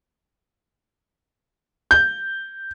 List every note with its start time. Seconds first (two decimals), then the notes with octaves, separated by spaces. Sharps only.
1.91 G6